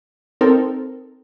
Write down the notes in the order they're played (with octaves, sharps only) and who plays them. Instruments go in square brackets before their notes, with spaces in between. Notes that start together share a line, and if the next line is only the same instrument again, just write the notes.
[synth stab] C4 D#4 A4 A#4